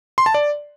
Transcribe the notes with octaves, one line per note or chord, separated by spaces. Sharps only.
C6
A5
D5